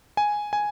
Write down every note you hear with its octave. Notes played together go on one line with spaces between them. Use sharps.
G#5
G#5